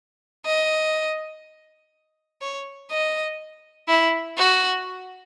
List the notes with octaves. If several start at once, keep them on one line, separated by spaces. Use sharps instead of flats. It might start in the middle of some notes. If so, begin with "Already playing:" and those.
D#5
C#5
D#5
E4
F#4